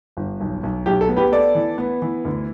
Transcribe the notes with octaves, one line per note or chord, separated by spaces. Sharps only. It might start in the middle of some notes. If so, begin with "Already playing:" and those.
G1
B1
B1
B1 G4
A4
B3
G4 B4
B3 A4 D5
E3
B3
E3
D2